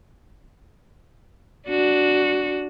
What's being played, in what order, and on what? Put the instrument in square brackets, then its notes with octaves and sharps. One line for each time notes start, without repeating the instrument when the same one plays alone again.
[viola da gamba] D4 F#4